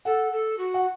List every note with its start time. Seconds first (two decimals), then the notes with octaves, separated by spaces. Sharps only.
0.05 A4 F#5
0.32 A4
0.58 F#4
0.74 F#5